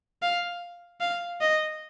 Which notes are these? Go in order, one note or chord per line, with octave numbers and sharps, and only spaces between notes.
F5
F5
D#5